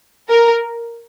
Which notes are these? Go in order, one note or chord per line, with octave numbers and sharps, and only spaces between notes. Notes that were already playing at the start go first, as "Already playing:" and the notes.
A#4